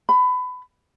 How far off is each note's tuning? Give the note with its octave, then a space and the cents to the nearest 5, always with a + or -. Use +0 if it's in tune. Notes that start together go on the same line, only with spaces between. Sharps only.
B5 +25